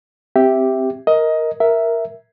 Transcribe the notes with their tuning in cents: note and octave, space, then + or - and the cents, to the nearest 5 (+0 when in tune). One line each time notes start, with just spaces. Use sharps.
C4 +0 G4 +0 E5 +0
A#4 +0 D#5 +15
A#4 +0 E5 +0